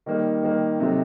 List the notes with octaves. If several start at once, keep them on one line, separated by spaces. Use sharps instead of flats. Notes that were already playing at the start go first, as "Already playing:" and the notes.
D#3 G3 A#3 D#4
D#3 G3 A#3 D#4
C3 F#3 A3 C4 D#4